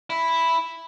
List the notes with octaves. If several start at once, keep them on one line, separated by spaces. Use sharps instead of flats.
E4